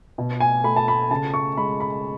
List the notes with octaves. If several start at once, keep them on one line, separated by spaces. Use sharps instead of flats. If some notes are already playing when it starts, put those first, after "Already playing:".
B2
G#5
A3 B5
A5
B5
C#3 A5
C#6
G#3 B5
B5